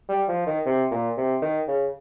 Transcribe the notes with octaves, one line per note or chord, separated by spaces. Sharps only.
G3
F3
D#3
C3
A#2
C3
D#3
C#3